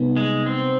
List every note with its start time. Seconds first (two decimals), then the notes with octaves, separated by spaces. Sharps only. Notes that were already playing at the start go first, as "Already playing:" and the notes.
Already playing: C3 G3 B3 D#4
0.17 G#3
0.46 C4